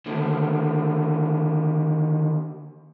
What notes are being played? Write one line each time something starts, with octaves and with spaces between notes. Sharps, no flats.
D#2 D3